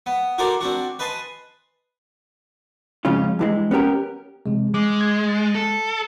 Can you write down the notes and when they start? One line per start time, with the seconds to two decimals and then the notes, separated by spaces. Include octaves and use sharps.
0.06 B3
0.38 F#4 A4 A#4 C5 D5
0.61 C4 D4 F#4
0.99 B4 D#5 G#5 A5 C6
3.05 F2 G#2 C#3 C#4 F4
3.39 G2 E3 G#3
3.71 B3 C#4 G4 A#4
4.46 C3 E3 G#3
4.74 G#3 D6
5.01 G#6
5.29 A6
5.55 A4